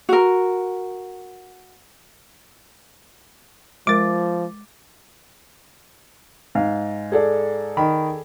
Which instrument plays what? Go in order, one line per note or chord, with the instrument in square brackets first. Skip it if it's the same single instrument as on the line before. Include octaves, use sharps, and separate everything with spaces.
[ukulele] F#4 A#4
[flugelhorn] F3 [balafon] G#3 A#4 [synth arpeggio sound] D6 A6
[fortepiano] G#2 F5
[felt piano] G#4 A4 D5
[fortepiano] D#3 B5